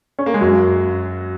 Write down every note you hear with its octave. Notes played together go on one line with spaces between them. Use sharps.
C#4
A#3
G#3
F#2 F#3